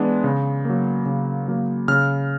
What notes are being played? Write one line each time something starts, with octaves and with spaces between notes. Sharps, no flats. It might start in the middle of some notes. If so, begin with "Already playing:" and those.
Already playing: E3 G#3 B3 D4
C#3
F#3 A#3
C#3
F#3 A#3
C#3 F6